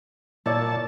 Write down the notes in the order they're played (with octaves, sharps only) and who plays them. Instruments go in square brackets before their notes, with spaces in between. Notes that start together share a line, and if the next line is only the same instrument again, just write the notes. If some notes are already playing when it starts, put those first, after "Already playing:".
[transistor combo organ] A#2 A5 [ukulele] E4 C#5 D5